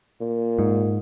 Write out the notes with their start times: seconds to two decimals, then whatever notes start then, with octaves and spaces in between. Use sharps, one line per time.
0.20 A#2
0.59 G#2